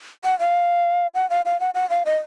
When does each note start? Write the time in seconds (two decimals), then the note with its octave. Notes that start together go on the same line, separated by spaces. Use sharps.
0.24 F#5
0.39 F5
1.15 F#5
1.30 F5
1.45 F5
1.60 F#5
1.74 F#5
1.90 F5
2.06 D#5